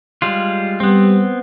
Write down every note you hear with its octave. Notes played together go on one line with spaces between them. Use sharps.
G3 G#3 F4
G3 B3 C4